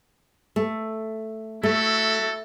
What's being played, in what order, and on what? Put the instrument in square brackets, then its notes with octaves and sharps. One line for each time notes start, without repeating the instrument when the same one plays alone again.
[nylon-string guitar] A3
[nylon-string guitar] A3 [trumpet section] E4 F#4 A4